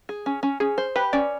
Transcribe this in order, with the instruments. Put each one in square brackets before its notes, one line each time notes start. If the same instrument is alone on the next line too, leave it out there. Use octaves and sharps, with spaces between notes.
[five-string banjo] G#4
C#4
C#4
[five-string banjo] C#4 [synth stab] G#4
[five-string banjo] C5
[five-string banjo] G4 [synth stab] B4
[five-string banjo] C#4 [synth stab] D5